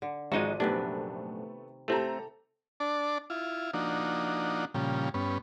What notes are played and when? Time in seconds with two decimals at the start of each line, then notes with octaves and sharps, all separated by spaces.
0.02 D3
0.32 G#1 F3 G#3 D4 D#4 F#4 D#7
0.60 A#1 F#2 C3 D#3 A3 B3 D4 B4
1.88 A3 C4 G4 A4 A#5
2.80 D4 D5 A5
3.30 E4 F4
3.74 F3 A#3 D4 D#4 F#4
4.74 A#2 C#3 F3 G3
5.14 G2 B3 C#4